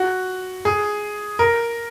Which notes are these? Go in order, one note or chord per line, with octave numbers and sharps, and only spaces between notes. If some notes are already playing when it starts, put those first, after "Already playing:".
Already playing: F#4
G#4
A#4